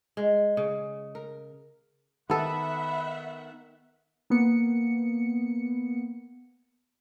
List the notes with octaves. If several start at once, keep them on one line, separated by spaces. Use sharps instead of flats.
G#3
C#3
A#4
D#3 B3 A4 E5 F#5 B5
A#3 B3 C#7